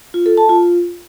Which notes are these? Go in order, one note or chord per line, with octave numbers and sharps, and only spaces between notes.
F4
A4
A5
F4